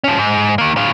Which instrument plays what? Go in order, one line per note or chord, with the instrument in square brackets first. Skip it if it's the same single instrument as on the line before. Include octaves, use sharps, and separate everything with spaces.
[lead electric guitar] F3 C#4
G#2
D#3 A#3
A2 F4